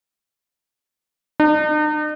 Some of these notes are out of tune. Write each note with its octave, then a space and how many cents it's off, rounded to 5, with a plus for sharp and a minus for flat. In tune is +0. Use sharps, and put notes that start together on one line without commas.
D#4 -45